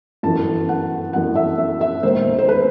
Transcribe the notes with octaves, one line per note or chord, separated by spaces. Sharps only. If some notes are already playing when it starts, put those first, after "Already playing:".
G1 F#2 E3 A5
F#5
G1 F#2 E3 F#5
E5
E5
E5
E1 D#2 D#3 C5
C5
B4